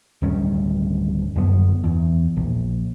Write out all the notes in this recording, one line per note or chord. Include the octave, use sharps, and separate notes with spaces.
D1 G2 D#3 C#4
G1 F#2 B3
E2
A#1